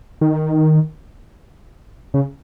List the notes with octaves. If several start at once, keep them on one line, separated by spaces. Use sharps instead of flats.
D#3
C#3